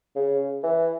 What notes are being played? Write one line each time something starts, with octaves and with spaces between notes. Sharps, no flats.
C#3
E3